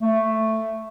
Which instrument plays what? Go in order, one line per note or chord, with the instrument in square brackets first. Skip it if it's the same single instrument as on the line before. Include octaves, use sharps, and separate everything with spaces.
[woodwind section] A3